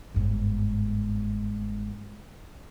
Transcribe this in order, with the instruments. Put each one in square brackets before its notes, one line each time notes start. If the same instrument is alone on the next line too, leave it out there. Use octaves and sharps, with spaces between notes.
[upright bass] G1 G#2